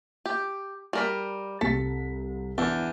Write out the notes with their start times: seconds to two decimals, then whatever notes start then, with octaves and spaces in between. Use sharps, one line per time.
0.26 G4
0.93 G3 A#4 B5
1.61 C2 C3 A4 B6
2.58 E2 D4